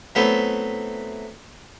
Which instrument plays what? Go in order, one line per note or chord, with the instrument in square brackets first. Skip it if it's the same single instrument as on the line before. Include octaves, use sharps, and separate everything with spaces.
[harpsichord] F#3 A3 B3 C4 E4